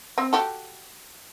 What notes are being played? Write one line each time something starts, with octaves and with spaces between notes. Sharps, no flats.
C4
F#4 G4 A4